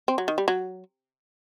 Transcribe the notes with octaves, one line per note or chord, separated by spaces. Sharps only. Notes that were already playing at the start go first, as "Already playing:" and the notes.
C4
F#3
D#3
G3
F#3